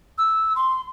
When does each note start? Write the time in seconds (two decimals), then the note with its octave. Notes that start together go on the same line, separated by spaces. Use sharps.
0.18 E6
0.55 C6